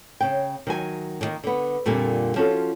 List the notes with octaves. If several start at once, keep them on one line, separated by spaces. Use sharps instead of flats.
C#3 G5
D#3 F#3 G#5
A2 D#3 A#3
D3 B3
F2 A#2 D3 G3 A#3 G#5
F3 C#4 F4 F#4 A4